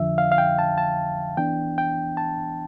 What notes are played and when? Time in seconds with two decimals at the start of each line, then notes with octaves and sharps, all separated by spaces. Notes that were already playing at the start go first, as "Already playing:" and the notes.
Already playing: F2 D3 F3 E5
0.18 F5
0.32 F5
0.38 G5
0.59 A5
0.78 A5
1.37 E3 B3 D4 G5
1.78 G5
2.17 A5